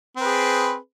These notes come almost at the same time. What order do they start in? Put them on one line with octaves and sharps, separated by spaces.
C4 B4 G#4